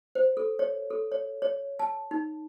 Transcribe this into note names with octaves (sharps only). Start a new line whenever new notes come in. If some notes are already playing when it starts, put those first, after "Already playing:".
C5
A4
C#5
A4
C#5
C#5
A5
D#4